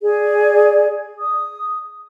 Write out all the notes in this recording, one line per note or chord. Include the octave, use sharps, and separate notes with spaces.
G#4 D5
D#6